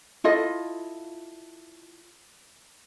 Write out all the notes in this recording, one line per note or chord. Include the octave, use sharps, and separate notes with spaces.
E4 F4 A4 D#5